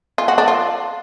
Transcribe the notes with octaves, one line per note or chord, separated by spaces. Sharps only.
F4
F#4
D4
F4